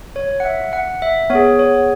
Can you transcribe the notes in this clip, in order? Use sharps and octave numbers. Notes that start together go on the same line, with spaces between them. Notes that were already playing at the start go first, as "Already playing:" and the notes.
C#5
F#5
E5
F#5
E5
B3 C#5
G#4
C#5